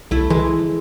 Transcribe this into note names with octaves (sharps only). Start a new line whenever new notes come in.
C2 A3 E4
E3 G#3